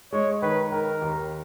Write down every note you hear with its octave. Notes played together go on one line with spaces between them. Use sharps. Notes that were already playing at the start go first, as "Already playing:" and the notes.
G#3 C#5
D#3 B4
D#3 A#4
D#2